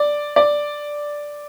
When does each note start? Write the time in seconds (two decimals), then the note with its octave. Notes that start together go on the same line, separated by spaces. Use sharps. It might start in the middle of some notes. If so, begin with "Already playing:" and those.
Already playing: D5
0.36 D5